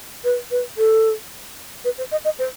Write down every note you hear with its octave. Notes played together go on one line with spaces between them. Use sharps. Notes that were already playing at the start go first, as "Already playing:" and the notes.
B4
B4
A4
B4
C5
D#5
D#5
C5